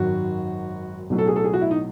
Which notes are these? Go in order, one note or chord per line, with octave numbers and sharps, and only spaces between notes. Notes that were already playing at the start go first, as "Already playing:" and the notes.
Already playing: G#1 F#2 D#3 F#3 F#4
B1 A2 F#3
A4
G#4
A4
G#4
F#4
E4
D#4